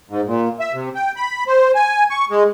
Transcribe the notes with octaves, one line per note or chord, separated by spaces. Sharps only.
G#2
A#2
E5
C3
G5
B5
C5
G#5
C#6
G#3